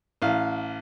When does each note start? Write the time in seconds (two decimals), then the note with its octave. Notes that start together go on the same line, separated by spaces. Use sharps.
0.22 A1 F5